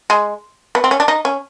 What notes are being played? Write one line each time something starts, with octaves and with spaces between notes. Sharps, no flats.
G#3
B3
C4
C#4
D4
D#4
C#4